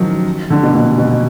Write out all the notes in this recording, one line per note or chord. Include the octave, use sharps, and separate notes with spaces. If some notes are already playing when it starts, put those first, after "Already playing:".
Already playing: D#3 F3 F#3
D3
B2
A#2
B2